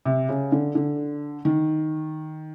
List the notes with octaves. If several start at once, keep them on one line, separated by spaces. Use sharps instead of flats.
C3
C#3
D3
D3
D#3